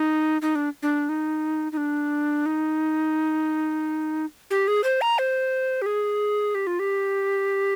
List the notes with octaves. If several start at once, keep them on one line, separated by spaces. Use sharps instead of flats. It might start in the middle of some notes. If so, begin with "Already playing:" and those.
Already playing: D#4
D#4
D4
D4
D#4
D#4
D4
D#4
G4
G#4
C5
A#5
C5
G4
G#4
G4
F4
G4